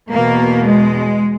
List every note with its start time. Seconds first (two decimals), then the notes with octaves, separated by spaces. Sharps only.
0.10 E2 B2 A#3
0.64 G#3